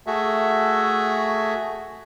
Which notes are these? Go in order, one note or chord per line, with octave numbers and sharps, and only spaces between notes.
A3 F#4 G#4 A4 E5